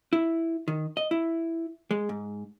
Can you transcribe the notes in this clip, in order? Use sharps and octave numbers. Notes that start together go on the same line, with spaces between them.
E4
D#3
D#5
E4
G#3
G#2